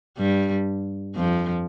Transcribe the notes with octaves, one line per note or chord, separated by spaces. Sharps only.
G2 G3
F2 F3